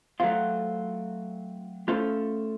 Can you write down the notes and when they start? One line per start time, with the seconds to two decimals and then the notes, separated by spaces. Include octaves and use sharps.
0.20 F#3 A3 C4 F4
1.88 A3 C#4 F4 A4 C5